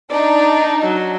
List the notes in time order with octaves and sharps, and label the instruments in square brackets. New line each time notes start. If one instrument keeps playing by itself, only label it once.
[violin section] D4 D#4 [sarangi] D5
[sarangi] F#3